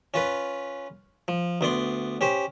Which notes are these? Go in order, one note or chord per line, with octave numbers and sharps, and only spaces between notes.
C#4 F4 B4
F3
D2 B3 D5 C6
C#4 G4 C5